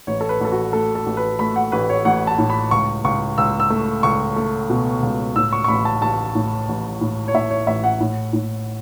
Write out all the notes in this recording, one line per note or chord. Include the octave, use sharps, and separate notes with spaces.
A1 C#5
A4
B4
A1 A4
F#4
A3 A4
A4
A1
B4
A3 B5
F#5
A1 B4
C#5
A1 F#5
A5
A2
B5
C#2 C#6
C#2 C#6
C#2 E6
E6
A3
C#2 C#6
A3
B2
C#2
A2 E6
C#6
C#6
A1 B5
A5
A1 A5
A2
A1
A2
C#5
A2 E5
C#5
A1 E5
F#5
A2
A2